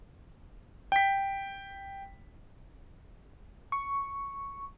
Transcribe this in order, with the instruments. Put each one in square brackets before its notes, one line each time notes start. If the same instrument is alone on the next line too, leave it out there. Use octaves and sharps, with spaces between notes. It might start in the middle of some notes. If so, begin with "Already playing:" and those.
[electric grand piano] G5 B6
[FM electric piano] C#6